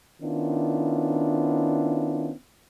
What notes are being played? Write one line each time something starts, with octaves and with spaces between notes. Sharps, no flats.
D#3 B3 C#4 D4 E4 F4